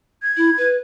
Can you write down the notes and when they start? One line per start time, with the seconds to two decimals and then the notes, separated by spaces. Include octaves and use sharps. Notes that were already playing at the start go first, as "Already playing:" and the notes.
0.22 G#6
0.37 E4
0.58 B4